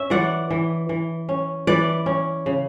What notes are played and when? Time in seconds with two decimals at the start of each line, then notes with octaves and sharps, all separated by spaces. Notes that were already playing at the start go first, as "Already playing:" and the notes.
Already playing: C#4 E5
0.10 E3 D5 F#5
0.50 E3
0.89 E3
1.29 C#4
1.67 E3 B4 D5
2.06 C#4
2.46 C#3